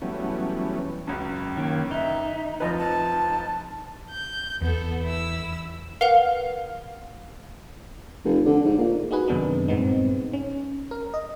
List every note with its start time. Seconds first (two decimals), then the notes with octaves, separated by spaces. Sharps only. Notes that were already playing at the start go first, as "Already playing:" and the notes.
0.02 E3 F#3 G3 A3 B3 C#4
1.07 C#2 F#2
1.57 D#3 A#3 C#5
1.91 D#4 E5
2.60 F1 F3 B4 D#5
2.77 A5
4.11 G6
4.61 E2 B3 A4
5.04 E4 E6
6.01 A#4 B4 F5 F#5
8.25 F1
8.46 D3
8.65 G#2
8.78 A#2
9.11 D#4 F#4 G#4 B4
9.28 F#2 C3 D#3 B3 D4 D#4
9.68 G2 A#2 G#3 B3 C4 D#4
10.33 C#4
10.91 A#4
11.14 D#5